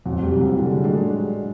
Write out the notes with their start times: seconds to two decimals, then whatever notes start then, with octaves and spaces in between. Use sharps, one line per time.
0.06 F2 F#3
0.23 G3
0.31 C3 E3
0.40 F#3
0.58 D3 G3
0.71 G#3
0.84 F#3 G#3 A3 D4